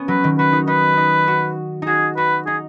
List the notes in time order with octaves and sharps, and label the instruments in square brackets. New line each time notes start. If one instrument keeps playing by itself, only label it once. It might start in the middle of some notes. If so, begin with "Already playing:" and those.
Already playing: [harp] B3 C#4
[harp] F#3 [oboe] B4
[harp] D#3
[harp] F#4 [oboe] B4
[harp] D#4
[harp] D#4 [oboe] B4
[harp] D#4
F#4
[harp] D#4 F#4 [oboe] G#4
[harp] F#4 [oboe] B4
[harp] D#4 [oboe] G#4